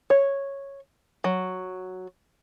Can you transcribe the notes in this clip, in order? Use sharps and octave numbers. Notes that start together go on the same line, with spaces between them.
C#5
F#3